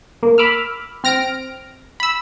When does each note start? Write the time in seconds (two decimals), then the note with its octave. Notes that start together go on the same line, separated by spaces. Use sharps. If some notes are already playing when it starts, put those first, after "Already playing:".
0.23 A#3
0.38 B5 D6 E6 F6
1.04 C4 F6 A#6 D7
2.00 B5 E6